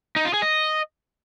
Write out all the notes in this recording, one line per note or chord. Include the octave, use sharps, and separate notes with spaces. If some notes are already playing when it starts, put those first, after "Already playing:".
D#4
F4
G#4
D#5